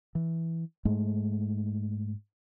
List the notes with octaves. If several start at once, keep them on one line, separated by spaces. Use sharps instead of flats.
E3
G#2 G#3 A3